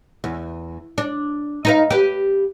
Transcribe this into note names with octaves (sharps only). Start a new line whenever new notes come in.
E2
D4
D#4 B4 F5
G4 B4